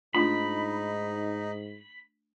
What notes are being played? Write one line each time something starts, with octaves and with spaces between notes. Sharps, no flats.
G#2 A3 D4 D#4 F4 B5